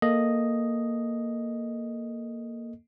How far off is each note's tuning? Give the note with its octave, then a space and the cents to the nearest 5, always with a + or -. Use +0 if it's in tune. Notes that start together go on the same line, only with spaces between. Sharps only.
A#3 +0 A4 +0 D#5 +0